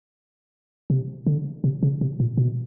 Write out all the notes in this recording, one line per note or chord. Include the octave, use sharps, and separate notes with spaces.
C3
D3
C3
C#3
C3
A#2
B2